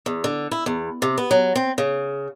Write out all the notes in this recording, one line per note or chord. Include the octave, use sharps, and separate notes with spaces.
E2
D3
E4
E2
C3
B3
F#3
C4
C#3